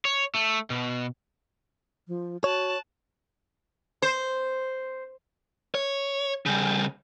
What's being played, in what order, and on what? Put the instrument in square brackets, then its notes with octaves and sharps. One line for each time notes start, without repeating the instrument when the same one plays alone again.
[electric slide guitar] C#5
A3
B2
[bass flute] F3
[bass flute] F#4 [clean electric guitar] C#5 [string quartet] A5 F#6
[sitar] C5
[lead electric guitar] C#5
C#3 G3